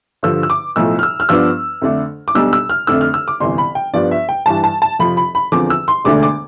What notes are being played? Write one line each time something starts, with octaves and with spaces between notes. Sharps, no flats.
G2 D3 F3 E6
E6
D6
B1 A2 F3 E6
F6
E6
F6
G2 F3 B3 D4 E6
F2 D3 A3 D4
D6
B1 B2 G3 D4 E6
E6
F6
F2 D3 A3 D4 E6
F6
E6
D6
G1 F2 C3 E3 C6
B5
G5
G2 F3 B3 D4 D5
E5
G5
G2 E3 G3 A5
A5
A5
F2 C3 F3 B5
B5
B5
E2 D3 F3 C4 D6
E6
C6
E1 D2 D3 A3 D4 D6
D6